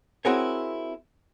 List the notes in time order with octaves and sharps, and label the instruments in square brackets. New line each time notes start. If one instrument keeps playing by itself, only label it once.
[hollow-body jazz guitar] C4 E4 F#4 G#4 A#4 C#5